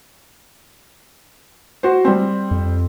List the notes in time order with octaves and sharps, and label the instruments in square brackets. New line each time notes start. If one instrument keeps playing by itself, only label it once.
[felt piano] F#4 C5
G3 C4
[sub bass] F2